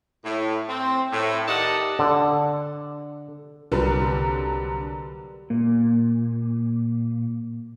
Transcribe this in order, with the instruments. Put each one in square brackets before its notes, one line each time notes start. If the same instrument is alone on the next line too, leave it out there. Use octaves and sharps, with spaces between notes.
[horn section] A2
C4
A2
D#3 G4 D5 D#5 F#5 A5
[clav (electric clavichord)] D3
[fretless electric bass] C2 [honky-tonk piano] D3 F#3 G3 [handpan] G4 A#4 B4
[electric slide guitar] A#2 [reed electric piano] A#3